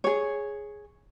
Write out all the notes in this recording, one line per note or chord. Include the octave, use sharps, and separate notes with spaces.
G#4 C#5